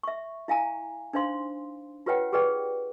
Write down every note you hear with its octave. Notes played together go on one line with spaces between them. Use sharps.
E5 C#6
E4 F5 G#5 A#5
D4 D#4 C5 F5 C6
F4 G4 B4 C#5 F#5 G5
G4 G#4 B4 D5 G5